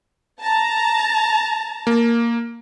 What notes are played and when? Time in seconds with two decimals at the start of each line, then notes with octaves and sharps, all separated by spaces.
0.41 A5 A#5
1.87 A#3